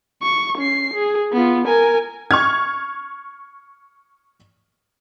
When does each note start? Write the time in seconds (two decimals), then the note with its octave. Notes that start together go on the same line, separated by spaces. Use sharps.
0.22 C#6
0.58 C#4 C7
0.94 G#4
1.32 B3 F4
1.66 A#4 G#5
2.31 C#6 F6 G#6